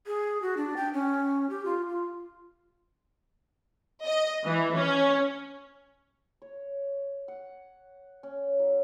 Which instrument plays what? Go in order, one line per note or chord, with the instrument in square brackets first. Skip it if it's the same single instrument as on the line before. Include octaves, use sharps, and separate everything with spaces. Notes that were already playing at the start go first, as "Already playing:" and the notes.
[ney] G#4
F#4
D4
G5
C#4
G4
F4
F4
[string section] D#5
E3
C#4
[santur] C#5
F#5
C#4
F#3